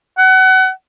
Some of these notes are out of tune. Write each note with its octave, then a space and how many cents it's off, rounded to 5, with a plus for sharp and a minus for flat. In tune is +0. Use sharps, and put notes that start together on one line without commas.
F#5 +30